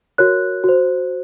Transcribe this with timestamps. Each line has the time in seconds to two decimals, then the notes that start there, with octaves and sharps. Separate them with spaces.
0.18 F#4 A#4 C#5 F#6
0.64 F#4 C5